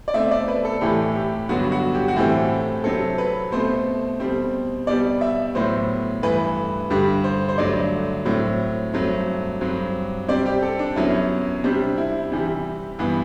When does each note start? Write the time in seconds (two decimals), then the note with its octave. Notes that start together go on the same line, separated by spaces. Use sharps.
0.08 D5
0.14 B2 A3 C4 E5
0.31 D5
0.48 B4
0.65 A4
0.81 A2 E3 A3 G4
1.15 G4
1.49 G2 D3 F#3 B3 F#4
1.72 F#4
1.94 G4
2.08 F#4
2.16 A2 E3 A3 C4 G4
2.84 C3 F#3 C4 A4
3.18 B4
3.52 B2 A3 C4 C5
4.20 B2 G3 C4
4.87 B2 G3 B3 D5
5.21 E5
5.55 A2 F#3 B3 C5
6.23 G2 E3 A3 B4
6.90 G2 D3 G3 G4
7.24 C5
7.49 C5
7.58 G2 D3 F#3 A3 D5
8.25 A2 F#3 C4
8.93 G2 F#3 A3 C4
9.61 G2 F#3 C4
10.28 C3 G3 C4 D5
10.46 G4
10.62 A4
10.79 D4
10.96 F#2 F#3 B3 E4
11.64 C3 G3 C4 D4
11.98 E4
12.32 C3 E3 G3
12.99 G2 E3 B3